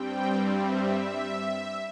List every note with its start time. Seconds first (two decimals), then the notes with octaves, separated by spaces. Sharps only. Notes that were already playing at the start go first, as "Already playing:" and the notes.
Already playing: G2 G3 C4 G5
0.57 E5